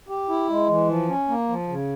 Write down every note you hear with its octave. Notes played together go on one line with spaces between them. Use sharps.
G4
E4
G#3
E3
F3
C#4
A#3
F3
C#3